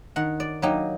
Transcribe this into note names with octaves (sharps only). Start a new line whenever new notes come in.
D#3 F#5
D5
F#3 A#3 D#4 G4